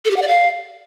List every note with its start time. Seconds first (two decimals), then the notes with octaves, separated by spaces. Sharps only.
0.05 A4
0.11 G4
0.16 F#5
0.22 D5
0.28 F5